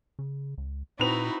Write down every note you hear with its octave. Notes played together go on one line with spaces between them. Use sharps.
C#3
C#2
A#2 C4 D#4 E4 F#4 B4 F7